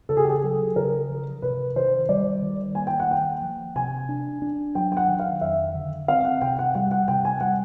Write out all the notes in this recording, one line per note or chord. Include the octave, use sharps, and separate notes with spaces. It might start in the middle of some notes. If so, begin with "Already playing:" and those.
C#3 A4
G#4
G4
G#4
F#3 A4
C#3 A#4
F3
C3 B4
D#3 C5
G3 D5
D#3
A#3 G#5
G5
F#5
A#3 G5
F3
C3 G#5
D4
D4
F#3 G5
G5
F#5
D#3
F5
F2 E5
D3
C4 F5
F#5
C3 G5
F#5
G3 F#5
F#5
C3 G5
G#5
G3 F#5